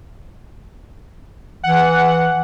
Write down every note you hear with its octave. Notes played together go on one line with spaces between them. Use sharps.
E3 F#5